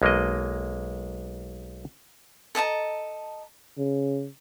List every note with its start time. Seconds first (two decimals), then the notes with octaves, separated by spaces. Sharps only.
0.02 B1 G#3 A#3 A#4 D#5
2.55 A4 D#5 A5 A#5
3.78 C#3